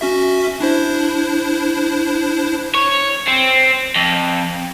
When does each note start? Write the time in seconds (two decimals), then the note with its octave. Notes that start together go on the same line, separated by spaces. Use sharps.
0.01 C#4 F#4 E5
0.60 D4 E4 C5
2.75 C#5
3.27 C4
3.96 F2